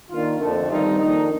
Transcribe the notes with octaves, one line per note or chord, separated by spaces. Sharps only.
D#3 A#3 D4 F4
F2 D3 A3
G2 D#3 G3 C4 D#4 F4
F2 D#3 A#3 D4 D#4